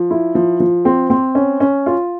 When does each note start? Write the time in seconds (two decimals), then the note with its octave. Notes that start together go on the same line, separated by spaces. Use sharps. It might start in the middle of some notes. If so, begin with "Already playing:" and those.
Already playing: F3
0.11 E4
0.35 F3
0.60 F3
0.85 C4
1.10 C4
1.35 C#4
1.60 C#4
1.86 F4